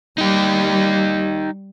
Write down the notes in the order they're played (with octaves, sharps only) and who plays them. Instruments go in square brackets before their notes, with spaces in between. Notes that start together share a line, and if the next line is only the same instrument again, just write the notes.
[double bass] G3 [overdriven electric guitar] D#4 G4